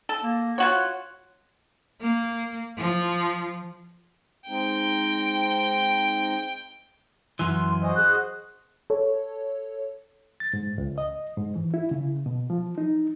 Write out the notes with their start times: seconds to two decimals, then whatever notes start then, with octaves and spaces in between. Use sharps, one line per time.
0.09 A4
0.23 A#3
0.58 F4 F#4 C#5 F#5
2.01 A#3
2.76 F3
4.48 G#3 C4 D#4 G5
7.39 F#2 E3 C6
7.82 F#4 C5 D#5 G#5
7.96 G#4 F#6
8.90 A4 C#5
10.40 A6
10.53 G#2
10.78 C#2
10.98 D#5
11.37 G#2
11.56 E3
11.74 E4
11.91 C#3
12.26 B2
12.50 F3
12.78 D#4